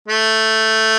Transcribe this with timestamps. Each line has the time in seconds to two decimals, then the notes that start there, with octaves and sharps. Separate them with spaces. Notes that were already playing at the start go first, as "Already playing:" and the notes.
0.08 A3